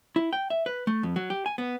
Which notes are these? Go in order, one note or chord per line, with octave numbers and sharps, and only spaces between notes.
E4
G5
E5
B4
A3
F2
F#3
G4
G#5
B3